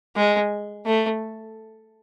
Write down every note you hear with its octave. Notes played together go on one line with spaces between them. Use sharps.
G#3
A3